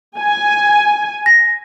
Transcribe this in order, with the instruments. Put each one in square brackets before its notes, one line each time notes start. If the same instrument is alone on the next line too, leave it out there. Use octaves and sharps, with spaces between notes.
[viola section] G#5
[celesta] A#6